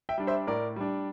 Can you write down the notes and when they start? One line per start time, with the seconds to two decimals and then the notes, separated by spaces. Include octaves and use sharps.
0.09 E5 G5
0.18 G3 D4
0.27 C5 E5
0.47 A2 A#4 D5
0.76 G3 D4